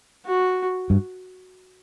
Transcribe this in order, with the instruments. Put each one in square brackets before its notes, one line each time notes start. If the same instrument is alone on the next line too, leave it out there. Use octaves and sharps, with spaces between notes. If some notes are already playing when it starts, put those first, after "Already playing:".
[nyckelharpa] F#4
[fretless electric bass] G2